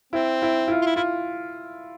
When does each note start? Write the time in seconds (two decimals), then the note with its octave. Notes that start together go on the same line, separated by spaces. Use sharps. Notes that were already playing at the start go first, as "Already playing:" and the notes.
0.13 C4 E4
0.42 E4
0.68 E4
0.71 F4
0.82 F4
0.86 E4
0.96 E4 F4